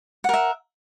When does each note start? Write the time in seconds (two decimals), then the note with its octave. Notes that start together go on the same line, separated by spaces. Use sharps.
0.24 F#5
0.29 A#4
0.34 E5